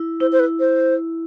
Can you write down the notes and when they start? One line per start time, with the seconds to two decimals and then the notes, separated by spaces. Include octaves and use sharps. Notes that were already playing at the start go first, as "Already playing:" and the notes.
Already playing: E4
0.20 E4 C5
0.32 C5
0.39 B4
0.59 C5